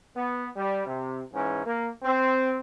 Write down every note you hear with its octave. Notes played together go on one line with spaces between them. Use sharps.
B3
G3
C3
G#2 E3 C#4
A#3
C4